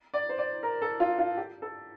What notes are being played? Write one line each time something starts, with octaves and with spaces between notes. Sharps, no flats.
D5
C5
D5
A#4
A4
F4
F4
G4
A4